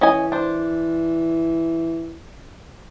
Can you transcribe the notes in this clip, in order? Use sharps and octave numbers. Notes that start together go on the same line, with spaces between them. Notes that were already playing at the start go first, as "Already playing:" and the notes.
E3 C#4 D#5 G#5
D4 C5